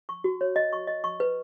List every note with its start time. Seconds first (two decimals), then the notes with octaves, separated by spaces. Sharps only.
0.09 C#6
0.24 F#4
0.41 C#5
0.56 D#5
0.73 C#6
0.87 D#5
1.04 C#6
1.20 B4